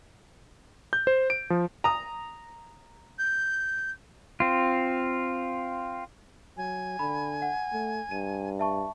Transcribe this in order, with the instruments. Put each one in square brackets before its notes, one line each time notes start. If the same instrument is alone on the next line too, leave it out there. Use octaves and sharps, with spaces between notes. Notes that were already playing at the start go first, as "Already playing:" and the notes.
[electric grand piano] G6
C5
D7
F3
[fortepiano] A#5 D#6
[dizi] G6
[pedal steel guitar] C4 F4
[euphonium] F#3 [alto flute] G#5
[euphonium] D3 [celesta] B5
[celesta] F#5
[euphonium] A3
[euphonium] G2 [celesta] D#7
[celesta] E5 A5 C#6